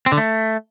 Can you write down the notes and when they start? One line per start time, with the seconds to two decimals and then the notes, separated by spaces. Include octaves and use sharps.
0.06 C4
0.12 D3
0.18 A3